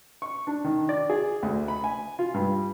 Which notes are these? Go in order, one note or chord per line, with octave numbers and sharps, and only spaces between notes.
C#6
D4
D#3
D5
G#4
D2
B5
G#5
F4
G2